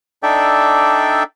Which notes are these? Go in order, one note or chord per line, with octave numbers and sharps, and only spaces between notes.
D4 D#4 A4 D5 E5 G5